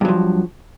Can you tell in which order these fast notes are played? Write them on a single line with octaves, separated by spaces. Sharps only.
G2 F#3 F3